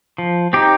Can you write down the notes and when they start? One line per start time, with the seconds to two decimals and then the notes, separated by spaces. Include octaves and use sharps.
0.18 F3
0.53 C4 D#4 G4